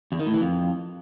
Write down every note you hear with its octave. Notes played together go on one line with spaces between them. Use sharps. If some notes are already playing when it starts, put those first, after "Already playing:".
E2
D#3
A2
E3
F2